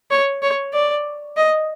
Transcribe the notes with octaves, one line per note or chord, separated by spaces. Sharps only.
C#5
C#5
D5
D#5